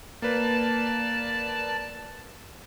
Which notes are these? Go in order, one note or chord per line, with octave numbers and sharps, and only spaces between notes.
A#3 B4 D5 A5